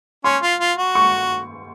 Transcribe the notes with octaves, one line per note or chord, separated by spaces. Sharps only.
C#4 C6
F4
F4
F#4
C#6